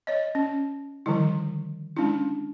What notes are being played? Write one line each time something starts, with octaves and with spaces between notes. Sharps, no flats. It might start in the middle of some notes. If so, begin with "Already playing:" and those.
C#5 D#5
C#4
D3 D#3 F3 G3 E4
G#3 C#4 D4 E4